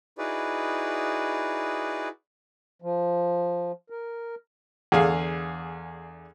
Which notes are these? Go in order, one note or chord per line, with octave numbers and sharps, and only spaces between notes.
D#4 E4 F#4 G#4 B4 D5
F3
A#4
E2 D3 G#4 F5